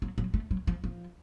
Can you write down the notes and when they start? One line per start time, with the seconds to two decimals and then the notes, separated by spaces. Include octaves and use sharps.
0.02 F#3
0.18 F#3
0.34 A3
0.51 F#3
0.67 F3
0.84 F3